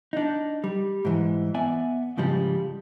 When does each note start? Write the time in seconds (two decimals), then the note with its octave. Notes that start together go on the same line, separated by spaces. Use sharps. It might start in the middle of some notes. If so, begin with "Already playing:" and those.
0.13 D4 D#4
0.64 G3
1.05 G#2 E3
1.54 B3 D5 E5 G#5
2.17 G#2 C#3 F3 G3